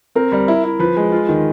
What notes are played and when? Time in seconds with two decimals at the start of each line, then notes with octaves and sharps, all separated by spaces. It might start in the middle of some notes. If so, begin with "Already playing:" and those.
0.15 C4 A#4
0.32 G3
0.48 E4
0.64 E4
0.79 F3 B4
0.96 G#3
1.12 F4
1.29 D#3